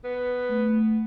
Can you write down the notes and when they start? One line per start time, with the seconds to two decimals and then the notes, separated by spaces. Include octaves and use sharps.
0.04 B3
0.49 A3